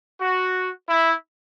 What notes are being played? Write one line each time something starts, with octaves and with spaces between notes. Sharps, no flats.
F#4
E4